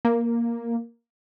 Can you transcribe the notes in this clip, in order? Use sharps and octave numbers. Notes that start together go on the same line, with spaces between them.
A#3